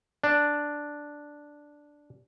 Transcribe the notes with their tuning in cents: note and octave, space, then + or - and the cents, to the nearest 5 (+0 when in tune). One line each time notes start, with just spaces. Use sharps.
D4 +0